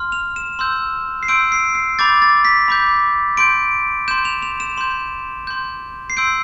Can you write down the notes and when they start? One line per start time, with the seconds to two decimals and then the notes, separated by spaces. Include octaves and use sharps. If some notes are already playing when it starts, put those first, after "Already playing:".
Already playing: C6 F6
0.12 F7
0.36 E7
0.59 C6 E6 G6
1.23 C7
1.28 C6 E6 G6 D7
1.52 C7
1.75 C7
1.99 B5 D6 G6 A6
2.22 A6
2.45 B6
2.68 B5 D6 G6
3.37 C6 G6 D7
4.08 C6 G6 E7
4.25 F7
4.42 F7
4.60 E7
4.77 C6 G6
5.47 C6 G6
6.10 C7
6.17 C6 E6 G6 D7